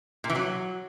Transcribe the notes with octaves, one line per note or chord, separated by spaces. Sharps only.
A#2
E3
F#3